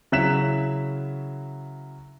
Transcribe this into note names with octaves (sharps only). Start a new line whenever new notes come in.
C#3 F#3 E4 F#6 B6 E7